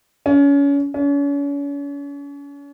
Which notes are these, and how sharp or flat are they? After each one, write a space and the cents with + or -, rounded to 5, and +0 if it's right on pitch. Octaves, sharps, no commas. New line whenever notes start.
C#4 +30
C#4 +40